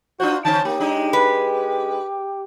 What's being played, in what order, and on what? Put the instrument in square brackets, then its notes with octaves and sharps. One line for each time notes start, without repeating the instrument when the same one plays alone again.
[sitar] D4 F4 C5 [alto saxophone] F#4
[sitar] D3 C#4 C5 [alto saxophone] A5
[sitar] A#3 [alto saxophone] G4
[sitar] G#3 D4 D#4
[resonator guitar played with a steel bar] B4